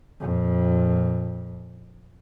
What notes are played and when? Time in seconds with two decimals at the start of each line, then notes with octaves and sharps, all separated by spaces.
0.21 F2 A#2